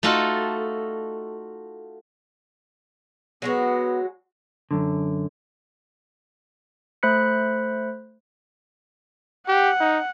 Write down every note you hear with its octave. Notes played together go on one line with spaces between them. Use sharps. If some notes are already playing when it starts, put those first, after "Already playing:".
A3 D#4 F4 F#4 A4
F#3 G#3 B3 F#4
F#2 D3
A3 C5 B5 F#6 B6 C#7
G4 F#5
D#4